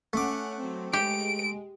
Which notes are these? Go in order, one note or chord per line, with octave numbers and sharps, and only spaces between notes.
A3 C#4 F#5 D6
F#3 C4
G#3 G4 D7